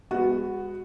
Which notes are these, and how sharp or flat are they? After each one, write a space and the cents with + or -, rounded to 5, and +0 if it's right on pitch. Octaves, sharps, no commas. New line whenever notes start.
G#3 -35 B3 +5 F#4 +0